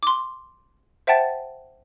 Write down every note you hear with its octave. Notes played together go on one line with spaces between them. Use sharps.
C6 D6
C5 E5 F#5 G5 A5 A6